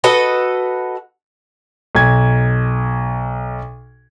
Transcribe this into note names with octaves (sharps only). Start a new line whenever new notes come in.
F#4 A4 B4 D#5
B1 G#6